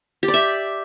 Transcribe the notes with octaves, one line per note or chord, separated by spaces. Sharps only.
G4
D5
E5